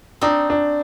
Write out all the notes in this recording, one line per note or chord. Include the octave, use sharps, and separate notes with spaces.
C4 D4 D#4
D4